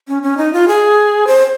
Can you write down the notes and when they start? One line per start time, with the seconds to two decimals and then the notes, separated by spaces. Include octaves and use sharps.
0.08 C#4
0.23 C#4
0.37 D#4
0.53 F4
0.68 G#4
1.27 C5